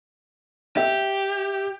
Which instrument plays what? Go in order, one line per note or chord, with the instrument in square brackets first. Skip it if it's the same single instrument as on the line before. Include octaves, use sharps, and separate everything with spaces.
[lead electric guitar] G4 [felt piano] E5